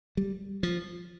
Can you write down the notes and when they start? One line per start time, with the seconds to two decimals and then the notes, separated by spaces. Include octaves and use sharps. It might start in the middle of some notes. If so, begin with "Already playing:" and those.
0.17 G3
0.63 F3